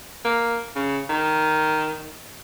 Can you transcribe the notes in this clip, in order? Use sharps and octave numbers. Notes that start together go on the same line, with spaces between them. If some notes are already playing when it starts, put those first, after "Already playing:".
A#3
C#3
D#3